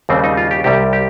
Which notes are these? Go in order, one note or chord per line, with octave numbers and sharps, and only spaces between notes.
D#2 C#3 G3 C4
D#4
F4
G4
C2 C3 G3 G4
G4